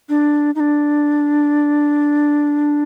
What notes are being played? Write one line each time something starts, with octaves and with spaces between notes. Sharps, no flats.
D4
D#4
D4